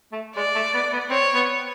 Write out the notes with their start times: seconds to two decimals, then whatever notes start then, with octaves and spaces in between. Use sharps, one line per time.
0.12 A3
0.36 G#3 D5
0.55 A3
0.74 B3
0.92 B3
1.10 C4 C#5
1.34 B3